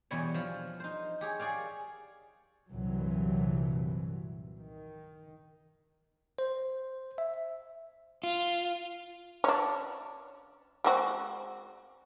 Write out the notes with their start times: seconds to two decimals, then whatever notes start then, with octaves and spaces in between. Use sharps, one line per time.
0.11 E2 B2 G3 C#5
0.34 F3
0.80 D#4 C5
1.21 G4 G#4 C#5
1.40 G#4 C#5 D5 F5
2.72 C2 G2 A#2 E3 F#3
4.58 D#3
6.39 C5
7.18 E5
8.23 F4
9.44 C#4 D4
10.84 G#3 C4 F#4